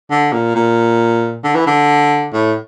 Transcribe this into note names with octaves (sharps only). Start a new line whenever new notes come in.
D3
A#2
A#2
D3
E3
D3
A2